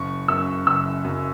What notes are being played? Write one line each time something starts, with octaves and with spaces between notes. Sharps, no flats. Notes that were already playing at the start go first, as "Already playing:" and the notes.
Already playing: F#1 C#6
F#2 C#3 E6
F#1 E6
F#2 C#3